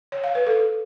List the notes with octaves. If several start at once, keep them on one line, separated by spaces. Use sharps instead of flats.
C#5
F5
B4
A4